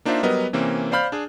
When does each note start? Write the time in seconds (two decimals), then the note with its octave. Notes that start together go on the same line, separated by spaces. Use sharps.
0.05 A#3 D4 D#4 F4 C5 E5
0.23 F#3 G3 B3 A#4 B4 D#5
0.53 C3 E3 A#3 C4 C#4
0.92 C5 D5 F5 B5 F6 G6
1.12 D4 G#4